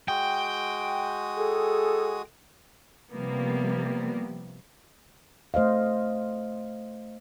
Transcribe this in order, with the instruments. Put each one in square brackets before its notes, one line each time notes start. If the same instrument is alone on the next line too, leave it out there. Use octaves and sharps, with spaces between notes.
[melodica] G#3 F#4 D#6 [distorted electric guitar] G5
[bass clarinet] G#4 [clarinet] A4
[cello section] C3 F3 G3 A#3 B3
[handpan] A3 C5 D#5 F5